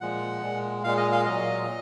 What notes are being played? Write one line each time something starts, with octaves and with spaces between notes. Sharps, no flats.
A#2 F3 G#3 F#5
A#2 G#3
A#2 G#3 F5
D#5
F5
A#2 F#3 D#5